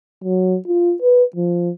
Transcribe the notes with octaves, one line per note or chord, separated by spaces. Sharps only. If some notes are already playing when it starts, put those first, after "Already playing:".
F#3
F4
B4
F3